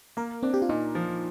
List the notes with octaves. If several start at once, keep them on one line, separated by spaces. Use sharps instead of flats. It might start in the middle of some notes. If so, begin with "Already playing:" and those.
A#3 A#4
C4 D4
G4
F4
A#2 D#4
F3